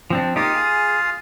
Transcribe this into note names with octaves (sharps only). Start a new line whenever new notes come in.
F3 C4 D4
A#3 D#4 F4 G4 F5 D#6
G#4